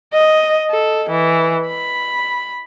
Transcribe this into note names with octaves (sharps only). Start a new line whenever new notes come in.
D#5
A4
E3
B5